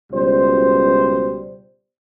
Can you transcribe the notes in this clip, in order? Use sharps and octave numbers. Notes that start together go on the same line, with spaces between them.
C#2 B2 G3 C5